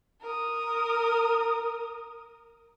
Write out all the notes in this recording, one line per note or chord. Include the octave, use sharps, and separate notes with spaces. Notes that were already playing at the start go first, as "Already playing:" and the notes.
A#4 D#6